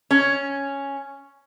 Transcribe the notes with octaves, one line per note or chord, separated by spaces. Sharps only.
C#4